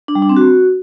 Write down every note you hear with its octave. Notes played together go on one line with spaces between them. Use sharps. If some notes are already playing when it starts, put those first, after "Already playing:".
D4
G3
D4
C4
F#4